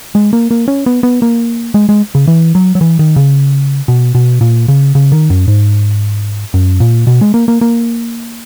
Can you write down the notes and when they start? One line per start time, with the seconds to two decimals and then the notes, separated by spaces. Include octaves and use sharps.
0.15 G#3
0.33 A#3
0.51 A#3
0.68 C#4
0.86 B3
1.03 B3
1.22 A#3
1.74 G#3
1.89 G#3
2.15 C#3
2.27 E3
2.55 F#3
2.75 F#3
2.81 E3
2.99 D#3
3.16 C#3
3.88 B2
4.15 B2
4.41 A#2
4.68 C#3
4.95 C#3
5.12 D#3
5.30 F#2
5.48 G#2
6.54 F#2
6.80 A#2
7.07 B2
7.21 G#3
7.34 A#3
7.48 A#3
7.61 A#3